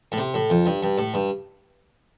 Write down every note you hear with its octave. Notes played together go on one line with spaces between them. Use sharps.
A2
C3
A2
F2
G2
G2
A2
G2